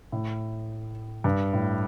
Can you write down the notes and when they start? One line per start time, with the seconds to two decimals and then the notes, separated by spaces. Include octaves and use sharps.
0.12 A2
1.24 G2
1.53 A2